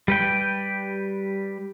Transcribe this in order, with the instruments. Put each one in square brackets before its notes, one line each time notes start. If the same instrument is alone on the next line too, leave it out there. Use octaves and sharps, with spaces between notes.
[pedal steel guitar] G3 B4 G5